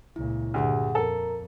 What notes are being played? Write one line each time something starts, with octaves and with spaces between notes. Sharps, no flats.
C#2 A#2 E4
D2 G2 A#2 G4 G#4 F#5
F2 A4 A#4 A#5